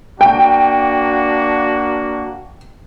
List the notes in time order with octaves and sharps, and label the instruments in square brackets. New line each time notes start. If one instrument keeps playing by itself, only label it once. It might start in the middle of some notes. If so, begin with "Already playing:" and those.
[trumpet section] A#3 D4 F#4 [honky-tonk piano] G5